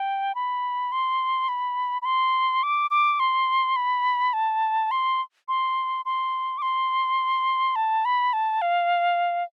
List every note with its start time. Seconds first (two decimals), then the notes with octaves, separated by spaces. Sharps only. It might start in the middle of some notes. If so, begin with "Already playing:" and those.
Already playing: G5
0.35 B5
0.92 C6
1.48 B5
2.02 B5
2.05 C6
2.63 D6
2.91 D6
3.20 C6
3.76 B5
4.33 A5
4.91 C6
5.48 C6
6.05 C6
6.58 D6
6.62 C6
7.76 A5
8.05 B5
8.33 A5
8.62 F5